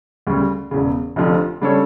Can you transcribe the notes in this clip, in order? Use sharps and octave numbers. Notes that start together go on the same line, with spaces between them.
D2 C#3 G3
E1 E2 C#3
F1 F2 D3 F3
C#3 G3 D4 A4 C#5